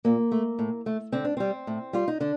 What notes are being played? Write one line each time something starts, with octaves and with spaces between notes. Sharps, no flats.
A#2 A#3
A3
A2
A3
D3 C4
D4
G3 C4
A2
G3 F4
D#4
D3 D4